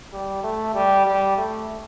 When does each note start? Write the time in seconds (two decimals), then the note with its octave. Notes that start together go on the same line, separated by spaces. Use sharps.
0.13 G3
0.43 A3
0.74 G3
1.06 G3
1.38 A3